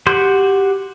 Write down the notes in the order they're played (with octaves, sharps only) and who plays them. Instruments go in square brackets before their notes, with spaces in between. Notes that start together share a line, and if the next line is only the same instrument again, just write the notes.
[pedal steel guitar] F#4 G4 C6 G6